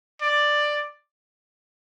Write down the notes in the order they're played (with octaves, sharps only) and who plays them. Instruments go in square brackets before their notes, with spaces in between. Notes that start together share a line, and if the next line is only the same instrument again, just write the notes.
[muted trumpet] D5